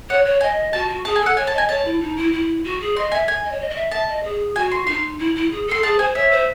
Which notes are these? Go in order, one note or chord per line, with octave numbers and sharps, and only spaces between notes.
C#5 F#5
C#5
D#5 G#5
F#4 A5
F#4
G#4 A5
G#5
A4
F#5
C#5 G#5
A5
D#5
G#5
C#5 A5
E4
D#4
E4
E4
F#4
G#4
D#5 C6
E5 G#5
G#5
D#5
C#5
D#5
D#5
E5
E5 A5
D#5
G#4
F#4 G#5
C6
D#4 C6
E4
E4
G#4
A4 C6
G#4 A5
C5 G#5
C#5 E5
C5